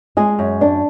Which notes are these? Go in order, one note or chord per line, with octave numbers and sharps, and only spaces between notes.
G#3 G#4
F#2
D4